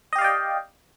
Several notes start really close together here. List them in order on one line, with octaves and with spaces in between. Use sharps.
D#5 G4 F5 D5 G5